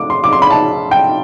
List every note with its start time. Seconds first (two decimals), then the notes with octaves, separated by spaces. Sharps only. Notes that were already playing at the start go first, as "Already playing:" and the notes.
Already playing: A3 D6
0.10 C6
0.24 D6
0.33 C6
0.42 B5
0.51 A5
0.91 G5